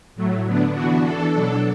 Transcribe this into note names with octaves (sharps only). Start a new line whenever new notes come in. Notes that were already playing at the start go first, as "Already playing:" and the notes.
A2 F#3 A3
D3 B3 D4
E3 B3 D4 F#4
E3 D4 A4
B2 F#3 D4